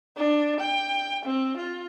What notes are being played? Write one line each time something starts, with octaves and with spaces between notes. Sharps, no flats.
D4
G5
C4
F4